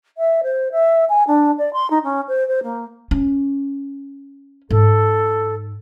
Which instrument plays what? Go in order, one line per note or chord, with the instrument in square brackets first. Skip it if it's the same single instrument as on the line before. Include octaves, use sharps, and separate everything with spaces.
[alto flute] E5
C5
E5
G#5
D4
D5
C6
D#4
C#4
C5
C5
A#3
[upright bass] C#4
[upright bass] G#2 [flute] A4